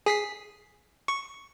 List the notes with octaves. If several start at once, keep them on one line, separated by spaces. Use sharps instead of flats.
G#4 B6 C7
C#6